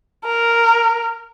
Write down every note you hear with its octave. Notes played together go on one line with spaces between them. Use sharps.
A#4